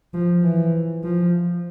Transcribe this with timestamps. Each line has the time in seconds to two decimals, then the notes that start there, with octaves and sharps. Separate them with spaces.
0.14 F3
0.43 E3
1.03 F3